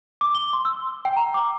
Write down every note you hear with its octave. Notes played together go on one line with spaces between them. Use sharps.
D6
G7
C6
E6
G5
A#5
D6